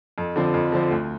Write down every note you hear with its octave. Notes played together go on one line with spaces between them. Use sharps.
F2
D3 F3 C4
F2
D3 F3 C4
D2